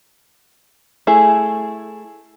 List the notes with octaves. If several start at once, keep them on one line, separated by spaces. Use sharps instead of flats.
A3 E4 G#4